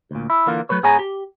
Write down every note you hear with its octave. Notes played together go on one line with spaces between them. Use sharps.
D2 A#2
E4
D3 E3 A#3 F4
F#3 A3 B4 C#5
G#2 B3 G#4 C#5 G#5 A#5
G4